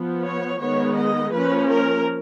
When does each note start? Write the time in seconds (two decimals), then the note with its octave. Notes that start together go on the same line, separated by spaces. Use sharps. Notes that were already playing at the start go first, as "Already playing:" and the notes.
Already playing: F3 B3
0.25 C#5
0.61 D#3 G#3 B3 C#5
0.97 D#5
1.33 F3 A#3 C#4 B4
1.70 A#4